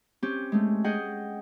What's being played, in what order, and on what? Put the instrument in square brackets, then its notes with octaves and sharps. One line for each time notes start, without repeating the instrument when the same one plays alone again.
[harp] C4 C#4 G4
G#3 A3
G#4 D#5 F#5 G5